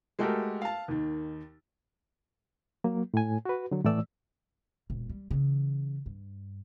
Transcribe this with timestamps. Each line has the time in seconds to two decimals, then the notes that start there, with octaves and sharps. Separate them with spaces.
0.19 G#3 A3 F#4 G4 A4 A#4
0.62 F5 A5
0.88 D#2 D#3
2.84 F#3 A#3
3.14 A2 G#5
3.45 F#4 B4
3.71 D3 F#3
3.85 A2 E3 A3 D5 E6
4.90 E1 A#2
5.10 G3
5.31 C#3 E3
6.06 G2